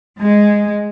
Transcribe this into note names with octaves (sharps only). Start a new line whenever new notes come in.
G#3